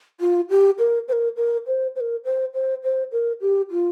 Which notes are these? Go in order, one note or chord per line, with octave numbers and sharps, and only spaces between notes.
F4
G4
A#4
C5
A#4
A#4
C5
C5
A#4
C5
C5
C5
A#4
G4
F4